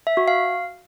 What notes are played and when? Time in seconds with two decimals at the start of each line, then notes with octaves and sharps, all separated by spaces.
0.07 E5
0.17 F#4
0.28 F5